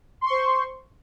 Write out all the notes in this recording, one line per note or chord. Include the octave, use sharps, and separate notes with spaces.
C5 C6 C#6